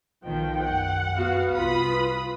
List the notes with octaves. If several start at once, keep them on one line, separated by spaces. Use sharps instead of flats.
B1 D#3 F3 G5
F#2 F#5
B3 F#4 F5
C2 F4 B4 B5 D#6